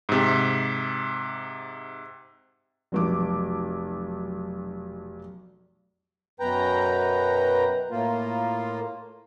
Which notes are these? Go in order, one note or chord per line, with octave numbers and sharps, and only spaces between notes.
G#2 C3
F1 B1 D6
F#2 B2 B4 G5 A#5
A2 A#3 F4